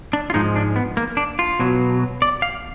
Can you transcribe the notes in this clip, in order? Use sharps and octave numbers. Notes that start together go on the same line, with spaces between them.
D4
F4
G#2 F3 G#3 D#4
D4
B3
A#3
D4
F4
B2 F#3
D5
F5